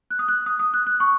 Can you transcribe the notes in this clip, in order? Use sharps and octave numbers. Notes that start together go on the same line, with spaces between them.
F#6
D#6
F#6
D#6
D#6
F#6
F#6
C#6